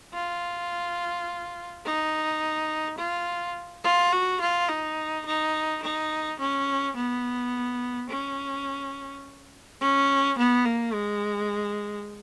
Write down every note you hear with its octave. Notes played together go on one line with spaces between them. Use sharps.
F4
D#4
F4
F4
F#4
F4
D#4
D#4
D#4
C#4
B3
C#4
C#4
B3
A#3
G#3